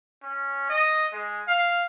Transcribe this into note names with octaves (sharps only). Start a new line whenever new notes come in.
C#4
D#5
G#3
F5